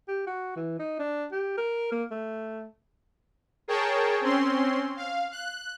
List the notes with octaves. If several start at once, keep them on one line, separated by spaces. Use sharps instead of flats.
G4
F#4
E3
D#4
D4
G4
A#4
A#3
A3
G#4 A#4 C#5 G5 A5
C4 C#4 C6
F5
F#6